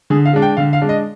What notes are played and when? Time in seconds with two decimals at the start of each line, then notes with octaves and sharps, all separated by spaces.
0.10 D3 G#4
0.25 F5
0.33 G#3 D4
0.42 G5
0.57 D3 F5
0.73 F5
0.81 G#3 D4
0.89 D#5